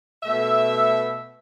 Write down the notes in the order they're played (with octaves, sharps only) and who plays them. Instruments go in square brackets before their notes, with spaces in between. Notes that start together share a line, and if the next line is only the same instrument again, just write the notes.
[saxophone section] B2 A3 E5